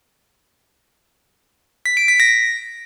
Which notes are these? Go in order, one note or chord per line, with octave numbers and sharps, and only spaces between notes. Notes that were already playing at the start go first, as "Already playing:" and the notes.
B6
D7
B6
A#6